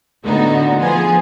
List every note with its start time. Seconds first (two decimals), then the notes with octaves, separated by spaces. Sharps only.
0.23 A2 D3 B3 D#4 F#4
0.79 F3 B3 G#4